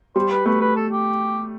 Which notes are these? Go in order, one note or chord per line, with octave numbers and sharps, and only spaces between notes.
G3 C5
B4
A3 B4
B4
A4
G4